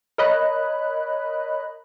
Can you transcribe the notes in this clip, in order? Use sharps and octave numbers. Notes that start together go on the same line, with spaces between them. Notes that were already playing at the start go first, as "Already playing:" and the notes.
A#4 C#5 D#5 B5 F#6